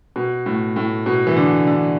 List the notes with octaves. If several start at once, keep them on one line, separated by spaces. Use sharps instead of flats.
B2
A2
A2
B2
E3
D3
D3